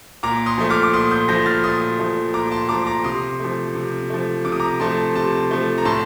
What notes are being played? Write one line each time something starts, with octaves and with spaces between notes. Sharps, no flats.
A#2 A#5 D6
C6 D#6
F3 A3
D6 F6
D6
A#2 C6 D#6
D#6 G6
F3 A3 G6 A#6
F6 A6
A#2 C6 D#6
F3 A3
A#2 A#5 D6
A5 C6
F3 A3 A#5 D6
A#5 D6
C3 C6 D#6
F3 A3
C3
F3 A3
C3 D6
D#6
A#5 D6
F3 A3 A5 C6
C3 A5 C6
F3 A3
A#5
A2 A5 C6